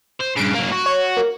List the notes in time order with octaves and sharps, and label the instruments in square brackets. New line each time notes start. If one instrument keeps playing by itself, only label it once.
[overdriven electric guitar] C5
[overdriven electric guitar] G2 C#3 [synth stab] D7
[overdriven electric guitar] F#3 A#3
F#4
[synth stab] C#5
A#3